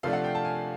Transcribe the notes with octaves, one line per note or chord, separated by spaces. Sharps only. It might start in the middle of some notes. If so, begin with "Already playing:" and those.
C3 F3 A3 D4 F5
F#5
G5
A5
G#5